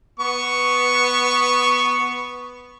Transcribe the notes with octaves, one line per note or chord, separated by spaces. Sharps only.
B3 C#6